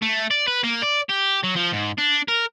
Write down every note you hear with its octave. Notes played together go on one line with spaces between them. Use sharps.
A3
D5
B4
A#3
D5
G4
F#3
F3
G#2
D4
A#4